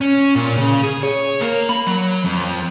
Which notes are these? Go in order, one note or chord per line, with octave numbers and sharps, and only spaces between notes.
C#4
A#2
C#3
G#4
C#5
A#3
B5
F#3
F2